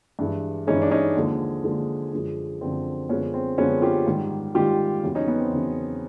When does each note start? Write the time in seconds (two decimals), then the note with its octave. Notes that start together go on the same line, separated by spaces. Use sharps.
0.19 G2 E3 G#3
0.67 G2 E3 G#3 C#4 D#4
0.82 D4
0.91 C#4 D#4
1.16 D#2 D3 F3 G#3
1.64 D#2 D3 F3 G#3
2.12 F#2 D3 F3 G#3
2.61 F#2 D3 F3 G#3 C4
3.09 F#2 D3 F3 G#3 B3 C#4
3.34 C4
3.58 F#2 D3 F3 G#3 B3 C#4
3.82 F4 G4
4.07 G#2 D#3 G3
4.55 G#2 D#3 G3 F4 G4
5.03 E2 C#3 F#3
5.15 C#4 D#4
5.28 B3
5.40 C4
5.52 E2 C#3 F#3